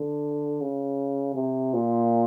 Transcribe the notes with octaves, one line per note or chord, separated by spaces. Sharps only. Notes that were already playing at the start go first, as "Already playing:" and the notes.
Already playing: D3
C#3
C3
A#2